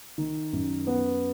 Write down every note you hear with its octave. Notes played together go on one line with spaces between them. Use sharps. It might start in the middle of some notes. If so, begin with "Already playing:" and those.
D#3
F#2
B3